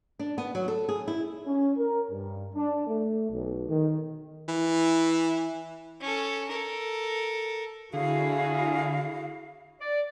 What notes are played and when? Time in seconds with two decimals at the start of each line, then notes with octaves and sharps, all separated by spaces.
0.19 D4
0.38 B3
0.55 F#3
0.68 A4
0.89 G#4
1.08 E4
1.46 C#4
1.76 A#4
2.11 G2
2.55 D4
2.87 A3
3.30 B1
3.69 D#3
4.48 E3
6.01 C#4 A4
6.49 A4 A#4
7.94 D3 E4 F#4 G#4 F5
9.80 D5